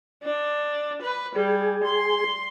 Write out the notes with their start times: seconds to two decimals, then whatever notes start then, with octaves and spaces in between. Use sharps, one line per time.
0.23 D4
1.02 B4
1.36 G3 G#4
1.84 C6